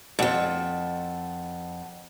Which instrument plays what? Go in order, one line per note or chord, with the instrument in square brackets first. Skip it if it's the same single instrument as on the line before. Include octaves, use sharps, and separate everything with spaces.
[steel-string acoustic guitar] F2 G#2 [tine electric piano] F#5 G5 A5